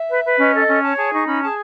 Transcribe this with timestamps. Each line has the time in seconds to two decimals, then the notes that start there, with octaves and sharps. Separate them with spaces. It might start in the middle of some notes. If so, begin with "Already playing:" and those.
Already playing: E5
0.09 B4
0.24 B4
0.39 C#4 D#5
0.53 A4
0.60 D#5
0.68 C#4
0.83 C#5 A5
0.96 G#4 A5
1.12 D#4 C#6
1.26 C#4 B5
1.41 G#4 A5